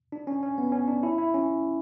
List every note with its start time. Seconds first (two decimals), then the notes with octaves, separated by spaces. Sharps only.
0.12 D4
0.27 C#4
0.43 C#4
0.58 B3
0.72 C#4
0.88 D4
1.03 E4
1.18 E4
1.34 C#4